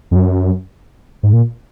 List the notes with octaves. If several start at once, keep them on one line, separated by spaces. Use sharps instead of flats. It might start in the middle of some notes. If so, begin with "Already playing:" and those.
F2
F#2
G#2
A#2